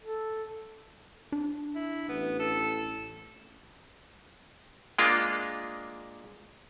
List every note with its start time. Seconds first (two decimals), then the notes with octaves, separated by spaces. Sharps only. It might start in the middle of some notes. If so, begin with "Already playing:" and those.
0.02 A4
1.32 D4
1.75 E4
2.09 A1 B3
2.40 A4
4.98 G#3 A#3 D4 F4